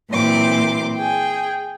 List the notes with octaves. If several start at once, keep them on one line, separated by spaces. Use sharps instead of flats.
A#2 E3 F#3 C4 C6 D6
G#4 G5